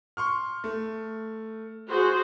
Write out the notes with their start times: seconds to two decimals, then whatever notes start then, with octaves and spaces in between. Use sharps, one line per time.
0.17 C6 C#6 F6
0.64 A3
1.89 F#4 G#4 C5